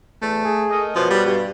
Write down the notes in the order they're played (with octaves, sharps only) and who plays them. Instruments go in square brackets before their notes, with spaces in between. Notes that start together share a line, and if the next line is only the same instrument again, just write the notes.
[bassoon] E2 [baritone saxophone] A3
[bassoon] G#4
[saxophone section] A3 A#4 D#5
[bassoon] F#2 [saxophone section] B2 [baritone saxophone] F3
[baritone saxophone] G3
[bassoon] G2 [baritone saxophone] G3